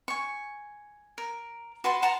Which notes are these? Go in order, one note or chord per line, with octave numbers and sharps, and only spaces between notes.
G#5 C#6
A#4
F#4 B4 A5 C6
F#5 A5 A#5 C6